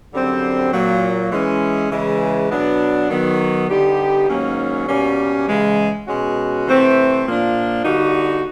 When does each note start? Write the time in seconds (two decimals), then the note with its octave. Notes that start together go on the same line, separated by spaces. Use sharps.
0.13 F#2 D3 G3 C4
0.72 A#2 F#3 A#3
1.32 E3 G#3 C#4
1.91 C#3 E3 G#3
2.51 B2 F#3 B3 D4
3.10 D#3 F#3 B3
3.69 D3 G3 B3 D#4 G4
4.28 G#2 D#3 F#3 A#3 C#4
4.88 B2 G3 A#3 C#4
5.48 C#3 E3 G#3
6.07 B2 G#3 C#4 F#4
6.66 C3 E3 A3 C4
7.25 A#2 F3 A#3 D4
7.85 D3 G3 A#3 D#4 F#4